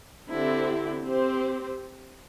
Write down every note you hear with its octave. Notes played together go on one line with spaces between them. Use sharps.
D3 C4 E4 G4
C4 G4 C5